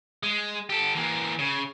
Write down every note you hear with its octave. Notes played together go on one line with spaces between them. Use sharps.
G#3
G4 A4
E3 A#3
C#3